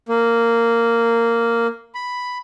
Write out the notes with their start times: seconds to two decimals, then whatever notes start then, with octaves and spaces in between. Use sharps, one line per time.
0.09 A#3
1.95 B5